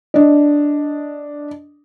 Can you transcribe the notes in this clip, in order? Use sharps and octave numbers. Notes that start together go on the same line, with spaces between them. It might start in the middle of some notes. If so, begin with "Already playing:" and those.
D4 D#5